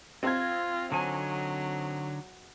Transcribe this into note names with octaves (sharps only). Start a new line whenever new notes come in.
C4 F4 G#6
D3 F#3 D#4 G#5